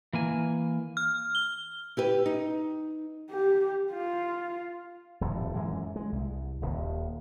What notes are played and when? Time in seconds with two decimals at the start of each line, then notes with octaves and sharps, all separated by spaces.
0.13 E3 A#3 G#5
0.97 F6
1.35 G7
1.97 E4 G4 B4
2.26 D#4
3.30 G4
3.92 F4
5.21 D#1 F2 A2
5.54 F#2 E3 G#3
5.96 G#3
6.12 C2
6.62 D#1 D#2